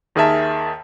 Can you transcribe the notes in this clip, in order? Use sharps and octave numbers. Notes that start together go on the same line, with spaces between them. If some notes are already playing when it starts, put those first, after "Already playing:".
D#2 D#3 G#4 A#4 E5 A5